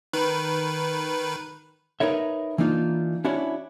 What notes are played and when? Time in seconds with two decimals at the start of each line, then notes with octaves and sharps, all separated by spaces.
0.13 D#3 B4
2.00 D#4 A#4 B4 C#5 E5
2.58 E3 A#3 D4 D#4 F4
3.24 C#4 D4 E4 F#4 C#5 D5